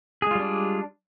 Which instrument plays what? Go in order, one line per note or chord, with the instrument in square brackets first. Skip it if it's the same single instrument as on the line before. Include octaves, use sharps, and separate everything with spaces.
[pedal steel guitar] G#4
G#3
F4
G3
D4